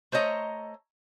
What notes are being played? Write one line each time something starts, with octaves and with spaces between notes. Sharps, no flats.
A3 C5 C#5 D#5 A#5